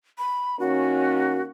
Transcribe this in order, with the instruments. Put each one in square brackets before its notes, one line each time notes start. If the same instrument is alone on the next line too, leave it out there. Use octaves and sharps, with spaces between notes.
[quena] B5
[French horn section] D#3 A#3 C#4 [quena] F#4